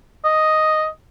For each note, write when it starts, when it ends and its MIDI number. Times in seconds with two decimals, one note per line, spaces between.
0.24 0.86 75